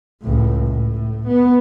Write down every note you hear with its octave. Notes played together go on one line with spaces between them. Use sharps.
C#2 A2
A2
B3